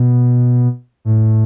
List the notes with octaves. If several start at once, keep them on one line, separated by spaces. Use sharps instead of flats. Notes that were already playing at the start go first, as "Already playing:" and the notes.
Already playing: B2
A2